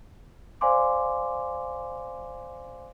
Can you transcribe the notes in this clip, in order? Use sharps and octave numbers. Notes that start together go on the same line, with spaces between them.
C5 D5 F5 G#5 C6 D6